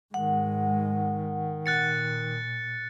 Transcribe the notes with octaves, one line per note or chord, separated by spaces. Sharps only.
G#2 D#3 G#3 F#5
A#2 F#6 A6 C#7